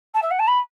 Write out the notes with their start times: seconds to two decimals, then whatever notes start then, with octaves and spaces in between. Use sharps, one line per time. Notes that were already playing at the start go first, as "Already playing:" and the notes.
0.14 A5
0.22 E5
0.31 F#5
0.39 A5
0.47 B5